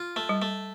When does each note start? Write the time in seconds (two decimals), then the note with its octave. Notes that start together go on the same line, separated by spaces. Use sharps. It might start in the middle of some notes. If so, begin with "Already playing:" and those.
Already playing: F4
0.16 A3
0.29 G3
0.42 A3